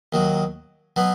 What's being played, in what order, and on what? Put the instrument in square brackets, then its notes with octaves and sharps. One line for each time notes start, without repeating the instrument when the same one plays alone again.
[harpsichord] D#2 D#3 F#3
B2 F#3 B3